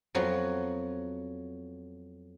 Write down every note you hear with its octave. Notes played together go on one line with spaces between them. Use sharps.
F2 F3 F#3 B3